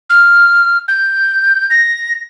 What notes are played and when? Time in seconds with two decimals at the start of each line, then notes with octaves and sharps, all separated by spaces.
0.10 F6
0.88 G6
1.70 A#6